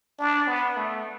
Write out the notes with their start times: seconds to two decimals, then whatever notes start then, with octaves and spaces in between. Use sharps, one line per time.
0.19 D4
0.47 B3
0.77 A3